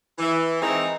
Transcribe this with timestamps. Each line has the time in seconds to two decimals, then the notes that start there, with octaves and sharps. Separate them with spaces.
0.18 E3
0.61 D#3 E3 G#3 C4 D#4 E4